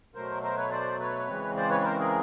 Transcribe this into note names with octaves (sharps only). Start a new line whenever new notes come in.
B2 F#3 A3 A#4 C5
A#4 C5
B4 C#5
C5 D5
B4 C#5
C#3 E3 G#3 C4
C5 D5
B4 C#5
B4
A#4 C5
G#4 A#4